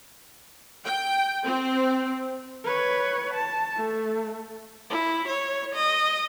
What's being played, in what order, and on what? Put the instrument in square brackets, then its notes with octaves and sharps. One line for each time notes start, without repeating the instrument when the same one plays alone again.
[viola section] G5
C4
[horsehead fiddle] B4 C#5
A5
A3
[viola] E4
C#5
D#5